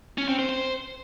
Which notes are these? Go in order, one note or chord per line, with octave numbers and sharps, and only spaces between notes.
C#4
C4
C5
C5